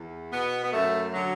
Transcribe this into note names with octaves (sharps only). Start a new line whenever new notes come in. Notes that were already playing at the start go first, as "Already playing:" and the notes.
Already playing: E2
B2 B3
B3
F#2 A3
D3 F#3